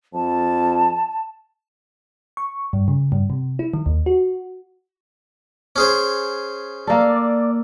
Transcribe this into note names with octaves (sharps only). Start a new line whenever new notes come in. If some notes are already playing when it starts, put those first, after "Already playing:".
F2 A5
C#6
G2
C#3
G2
C3
E4
D#3
D#2
F#4
C#4 G#4 C5
A#3 A4 D5